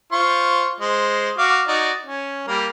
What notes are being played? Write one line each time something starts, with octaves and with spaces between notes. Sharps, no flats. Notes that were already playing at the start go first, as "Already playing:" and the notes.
F4 C5 C#6
G#3 C5
F#4 F5 D6
D#4 F#4 D5
C#4
G3 A#3 A#4